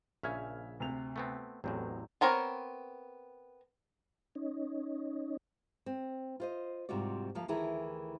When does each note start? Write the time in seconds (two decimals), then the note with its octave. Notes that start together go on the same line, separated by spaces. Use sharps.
0.23 A#1 C#3 C#4 E5 F6 G#6
0.80 D2 C3 F7
1.16 A3 B3 C4
1.64 A1 E2 A2 F#3 C4
2.21 B3 C4 A#4 C#5
4.35 C#4 D#4
5.86 C4
6.40 F4 C5 D#5
6.89 G#2 C3 G3 F4 F#4 D5
7.35 D2 F3 A#3 F5
7.48 D2 D#3 E3 E4 G#4 A#4